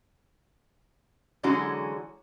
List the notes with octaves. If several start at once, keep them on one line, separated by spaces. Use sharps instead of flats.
D3 E3 F#3 G#3 C#4 F#4